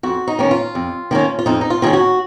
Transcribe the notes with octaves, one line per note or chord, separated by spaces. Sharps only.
F2 F#4
D#4
D#3 A#3 C#4
F4
F2
D#3 A#3 C#4
F4
F2 D#4
D#4
F4
D#3 A#3 C#4 G#4
F#4